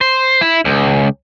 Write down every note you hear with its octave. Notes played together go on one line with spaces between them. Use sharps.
C5
E4
C#2